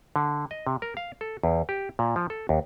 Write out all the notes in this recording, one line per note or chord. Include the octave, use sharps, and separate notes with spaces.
D3
D#5
C3
A#4
F5
A4
E2
G4
A#2
F3
A4
D#2